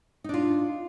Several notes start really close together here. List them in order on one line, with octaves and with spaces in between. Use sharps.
D#4 D4 F4